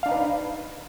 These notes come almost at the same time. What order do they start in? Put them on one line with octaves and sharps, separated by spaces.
F5 D4 D#4 B4